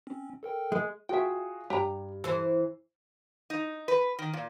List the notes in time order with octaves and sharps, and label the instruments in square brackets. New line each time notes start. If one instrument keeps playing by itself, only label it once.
[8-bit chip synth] C4 C#4
A4 A#4 G5
[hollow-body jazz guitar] G#3
[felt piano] F4 F#4 G#4 [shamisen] E5 G5
[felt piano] G2 [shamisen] G4 G5 A#5
[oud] E3 C5 [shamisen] A4
[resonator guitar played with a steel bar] D#4
B4
D#3
A#2